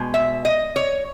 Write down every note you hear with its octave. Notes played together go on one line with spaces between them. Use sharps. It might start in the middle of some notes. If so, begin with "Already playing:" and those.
Already playing: B2 G#3
E5
D#5
C#5